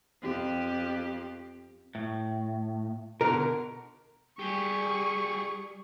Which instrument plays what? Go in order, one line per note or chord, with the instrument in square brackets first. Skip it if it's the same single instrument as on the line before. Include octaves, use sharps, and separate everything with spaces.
[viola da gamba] F2 G4
[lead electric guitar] A2
[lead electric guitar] B2 D3 [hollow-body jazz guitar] A#4
[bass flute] G3 [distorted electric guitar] G4 G#4 [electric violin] C#6